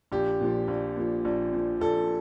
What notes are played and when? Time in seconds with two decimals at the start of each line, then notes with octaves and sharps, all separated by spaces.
0.12 A#1 G4
0.41 A#2 F3
0.68 A#1
0.96 A#2 F3
1.25 A#1
1.53 A#2 F3
1.81 A#1 A4